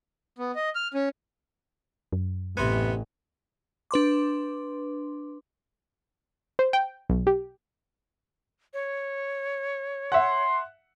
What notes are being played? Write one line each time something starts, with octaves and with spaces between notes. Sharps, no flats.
B3
D#5
F6
C#4
F#2
A1 C3 B3 C4 G#5
D4 B4 C6 D6
C5
G5
B1
G4
C#5
E5 F#5 C6